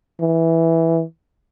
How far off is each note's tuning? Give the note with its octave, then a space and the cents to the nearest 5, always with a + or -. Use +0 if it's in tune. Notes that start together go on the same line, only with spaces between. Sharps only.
E3 -5